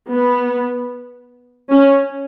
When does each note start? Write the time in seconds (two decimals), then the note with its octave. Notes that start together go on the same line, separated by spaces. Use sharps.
0.11 B3
1.70 C#4